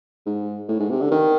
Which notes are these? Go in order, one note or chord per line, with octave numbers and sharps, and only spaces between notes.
G#2
A2
G#2
C3
D3
D#3